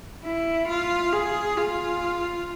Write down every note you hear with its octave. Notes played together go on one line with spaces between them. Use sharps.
E4
F4
G#4
F4